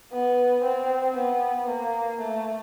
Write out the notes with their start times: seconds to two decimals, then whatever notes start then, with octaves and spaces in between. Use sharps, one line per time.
0.12 B3
0.64 C4
1.16 B3
1.69 A#3
2.21 A3